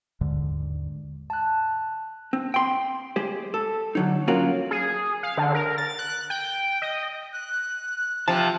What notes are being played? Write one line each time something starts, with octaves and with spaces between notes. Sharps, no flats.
D#2 G#2 D3 G#3
A5 F#6
C4
G5 C6
G#3 G4 C5
A4
D3 F#3 D#4
F#3 A#3 C#4 F4 F#4 A#4
G#4
F5
D3
A#4
A6
F#6
G5
D#5
F#6
C3 F3 A5